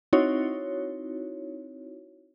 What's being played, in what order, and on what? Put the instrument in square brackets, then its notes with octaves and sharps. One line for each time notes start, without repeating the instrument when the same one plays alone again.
[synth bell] C4 D#4 E4 F#4 C#5